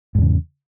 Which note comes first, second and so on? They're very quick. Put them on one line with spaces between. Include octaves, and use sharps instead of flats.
G#2 E2 C#3